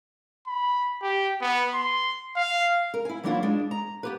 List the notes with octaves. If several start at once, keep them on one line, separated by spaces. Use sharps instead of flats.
B5
G4
B3
C6
F5
A#4
E4 G#5
E3 F#3 A#3 D4 E4 F4
G#3 D4
A#5
B3 G4 B4